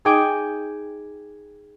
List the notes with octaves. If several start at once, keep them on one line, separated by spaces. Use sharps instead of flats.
D#4 G#4 D#5 G5 G#5 D6